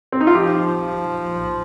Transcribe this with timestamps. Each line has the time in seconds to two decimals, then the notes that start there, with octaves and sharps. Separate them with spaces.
0.12 C4
0.21 D#4
0.27 F4
0.34 F3 G4